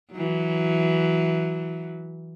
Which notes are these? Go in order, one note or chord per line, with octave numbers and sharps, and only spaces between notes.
E3 F#3